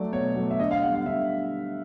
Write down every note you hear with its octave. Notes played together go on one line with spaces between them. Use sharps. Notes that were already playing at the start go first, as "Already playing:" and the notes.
Already playing: F#3 A3 D5
B2 C#5
F#3 A3
E5
D3 D#5
F5
G3 B3 F#5
F5
D3 E5